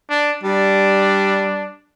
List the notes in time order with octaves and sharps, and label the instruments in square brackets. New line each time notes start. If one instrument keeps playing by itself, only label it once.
[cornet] D4
[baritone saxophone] G3 [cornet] D4